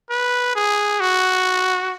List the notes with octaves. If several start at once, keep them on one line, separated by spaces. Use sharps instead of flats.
B4
G#4
F#4